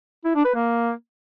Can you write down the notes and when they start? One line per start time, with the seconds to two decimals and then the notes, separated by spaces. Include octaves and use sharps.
0.25 E4
0.35 D4
0.45 B4
0.55 A#3